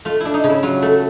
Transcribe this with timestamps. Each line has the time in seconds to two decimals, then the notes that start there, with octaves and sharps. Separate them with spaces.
0.05 A3 F4
0.21 D4 E4
0.34 D#4
0.44 C#3
0.50 E4
0.63 F#3 F4
0.82 A3